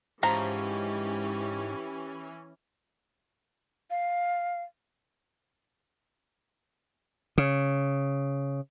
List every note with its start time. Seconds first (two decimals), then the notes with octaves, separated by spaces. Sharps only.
0.23 G#2 E3 F3 C#4 G4 C5 A#5
3.90 F5
7.38 C#3